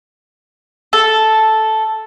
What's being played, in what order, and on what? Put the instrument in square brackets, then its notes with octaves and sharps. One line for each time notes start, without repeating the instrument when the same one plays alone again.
[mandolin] A4